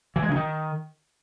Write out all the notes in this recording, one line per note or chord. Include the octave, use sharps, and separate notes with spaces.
E3
G#3
C#3
D#3